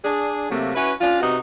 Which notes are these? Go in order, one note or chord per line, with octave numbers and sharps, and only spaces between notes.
D4 G#4
C3 F#3 A3 A#3
C#4 E4 F#4 B4
C#4 D4 F4
C3 B3 D#4 F#4